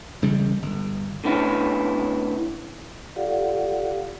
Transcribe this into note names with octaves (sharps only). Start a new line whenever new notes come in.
E1 C#3 G3 G#3
G1
A2 D3 B3 C#4 E4
F4 G4 A4 D5 F5 F#5